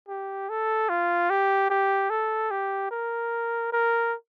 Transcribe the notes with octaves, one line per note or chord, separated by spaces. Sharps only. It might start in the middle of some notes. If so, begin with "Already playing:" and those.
G4
A4
F4
G4
G4
A4
G4
A#4
A#4